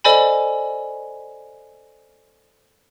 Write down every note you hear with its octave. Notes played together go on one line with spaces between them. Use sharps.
A4 C5 D5 D#5 G#5 B5